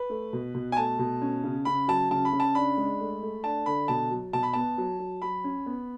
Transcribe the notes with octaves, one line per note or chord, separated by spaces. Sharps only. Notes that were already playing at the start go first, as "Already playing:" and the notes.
Already playing: B4
A3
B2
B2
G#5
A3 A5
B2
C#4
C#3
C#3 B5
F#3 A5
C#3 A5
B5
C#3
A5
D4 B5
G#3
A3
A3
D4 A5
D3 B5
B2 A5
F#3
B2 A5
B5
B3 A5
F#3
F#3
F#3 B5
C#4
B3